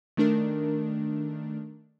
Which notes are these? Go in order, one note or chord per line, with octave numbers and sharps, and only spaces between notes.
D#3 A3 D4 A#4